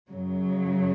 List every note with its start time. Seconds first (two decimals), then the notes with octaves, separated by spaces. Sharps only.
0.12 F#2 C#3 F#3